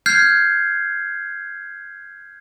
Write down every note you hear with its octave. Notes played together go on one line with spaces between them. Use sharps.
F6 G6 G#6 C7